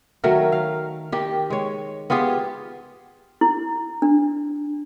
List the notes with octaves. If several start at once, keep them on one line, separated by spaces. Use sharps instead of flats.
D#3 F#3 A3 A#4
F5
D#3 G4
G#3 C#5
B3 F4 G4 G#4
E4
D4